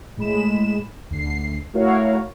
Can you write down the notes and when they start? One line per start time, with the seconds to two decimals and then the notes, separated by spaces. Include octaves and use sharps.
0.17 A2 G#3 B5 E7
1.11 D2 C7
1.73 A3 E4 F#4 A#4 C#5 F5